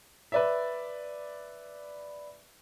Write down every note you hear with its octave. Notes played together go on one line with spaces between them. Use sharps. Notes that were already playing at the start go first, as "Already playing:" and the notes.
B4 D5 E5